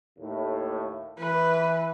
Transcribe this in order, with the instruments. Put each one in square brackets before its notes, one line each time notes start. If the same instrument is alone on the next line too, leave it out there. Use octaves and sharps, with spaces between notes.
[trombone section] D#2 A2
[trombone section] E3 [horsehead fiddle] B4